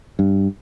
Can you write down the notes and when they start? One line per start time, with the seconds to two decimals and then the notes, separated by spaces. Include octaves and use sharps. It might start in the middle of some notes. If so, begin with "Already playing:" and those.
0.19 G2